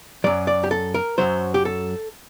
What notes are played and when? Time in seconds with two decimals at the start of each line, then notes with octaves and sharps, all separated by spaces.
0.24 F#2 F#3 D5
0.47 D5
0.64 G4
0.71 A4
0.94 A#4
1.18 F#2 F#3 C5
1.54 G4
1.65 A4